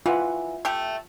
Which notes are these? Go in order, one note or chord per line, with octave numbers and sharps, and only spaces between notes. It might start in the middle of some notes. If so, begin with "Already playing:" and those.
E3 F4 F#5
A3 G4